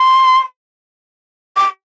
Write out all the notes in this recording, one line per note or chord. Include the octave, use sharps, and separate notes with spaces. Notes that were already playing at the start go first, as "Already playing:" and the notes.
Already playing: C6
D6